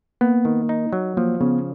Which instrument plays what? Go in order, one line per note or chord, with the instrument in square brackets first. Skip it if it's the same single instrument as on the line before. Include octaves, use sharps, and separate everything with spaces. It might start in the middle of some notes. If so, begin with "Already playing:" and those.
[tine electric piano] A#3 [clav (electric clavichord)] B3
[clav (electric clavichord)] D#3
D#4
F#3
[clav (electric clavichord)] F3 [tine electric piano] A#3
[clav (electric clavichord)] C#3 [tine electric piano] B3